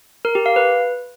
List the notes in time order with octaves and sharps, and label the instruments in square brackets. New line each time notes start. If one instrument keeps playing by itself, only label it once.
[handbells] A#4
G4
F5
B4